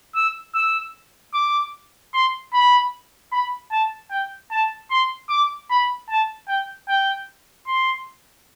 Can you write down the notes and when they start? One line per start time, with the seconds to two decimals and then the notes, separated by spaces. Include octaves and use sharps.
0.16 E6
0.54 E6
1.34 D6
2.14 C6
2.53 B5
3.32 B5
3.71 A5
4.11 G5
4.51 A5
4.90 C6
5.30 D6
5.70 B5
6.09 A5
6.48 G5
6.89 G5
7.67 C6